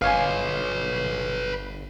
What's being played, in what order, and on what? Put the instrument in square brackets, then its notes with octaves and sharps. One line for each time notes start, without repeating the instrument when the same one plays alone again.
[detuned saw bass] G1 [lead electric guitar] B4 C#5 [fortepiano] F5 G#5